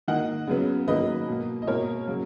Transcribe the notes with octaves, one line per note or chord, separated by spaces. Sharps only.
D#3 A#3 D#5 F#5
C#3 F#3 B3
D#3 F#3 A#3 B4 D#5
B2 A#3
D#5
B2 A#3 A#4 C#5
C#3 F#3 A#3